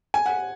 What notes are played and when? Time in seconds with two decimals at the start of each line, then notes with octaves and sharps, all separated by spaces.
0.14 G#5
0.26 F#5